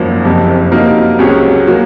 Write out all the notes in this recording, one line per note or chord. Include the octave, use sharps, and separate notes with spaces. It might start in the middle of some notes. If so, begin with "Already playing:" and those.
Already playing: G#1 F#2 F3 A#3
F#1 F2 C3
C3 F#3 A#3 D#4 A#4
C#2 C3 F#3 C#4 G#4
F#3 A#3